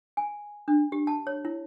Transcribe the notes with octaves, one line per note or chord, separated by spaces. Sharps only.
G#5
D4
G4
A5
C#5
E4